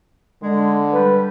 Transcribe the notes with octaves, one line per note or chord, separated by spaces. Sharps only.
D3 G#3
G3 B4